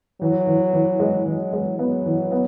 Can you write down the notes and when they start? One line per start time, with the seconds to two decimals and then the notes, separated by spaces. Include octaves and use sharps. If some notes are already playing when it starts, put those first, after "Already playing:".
0.21 E3 F#3
0.47 E3
0.73 E3
1.00 G#3
1.26 E3 F#3
1.53 G#3
1.79 F#3 B3
2.06 E3
2.32 B3